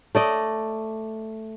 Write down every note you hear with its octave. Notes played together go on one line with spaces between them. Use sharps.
A3 D5 D#5